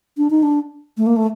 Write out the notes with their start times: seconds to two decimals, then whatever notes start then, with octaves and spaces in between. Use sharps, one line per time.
0.18 D4
0.30 D#4
0.43 D4
0.97 A3
1.07 A#3
1.16 A3